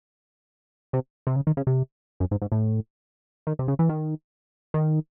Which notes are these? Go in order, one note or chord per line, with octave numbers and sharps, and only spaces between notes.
C3
C3
C#3
D#3
C#3
C3
F#2
G#2
G#2
A2
D#3
C3
C#3
E3
D#3
D#3